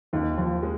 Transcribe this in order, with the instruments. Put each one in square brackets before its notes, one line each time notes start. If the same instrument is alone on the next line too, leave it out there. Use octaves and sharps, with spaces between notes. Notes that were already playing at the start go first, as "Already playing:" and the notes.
[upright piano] D#2 [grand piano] D#3
[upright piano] D#2 [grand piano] F3
[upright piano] G#3